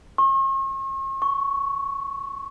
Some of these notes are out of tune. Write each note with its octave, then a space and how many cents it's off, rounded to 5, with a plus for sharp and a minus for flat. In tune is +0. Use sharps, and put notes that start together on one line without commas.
C#6 -45
C#6 +5